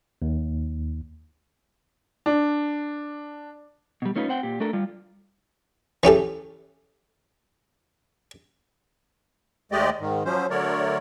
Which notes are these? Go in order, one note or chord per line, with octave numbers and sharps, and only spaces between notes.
D#2
D4
B2 G3
A3 C#4 D#4 F4 A4 B4
C4 C5 F#5 G5
A#2 G4
A3 D4 A4 A#4
G3 F4
E3 C#4 G4 A4
D#2 G#3 A3 G4 D5 D#5
G#2 D#3
F3 F#3 C#4 C5
D3 F#3 A3 A#4 C#5 D5